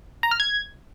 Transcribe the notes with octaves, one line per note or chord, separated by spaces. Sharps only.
A#5
F6
G#6